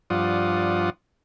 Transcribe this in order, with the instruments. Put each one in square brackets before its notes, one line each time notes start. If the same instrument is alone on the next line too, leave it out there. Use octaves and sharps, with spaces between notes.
[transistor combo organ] G2 F3 F4 D5 F#5 D#6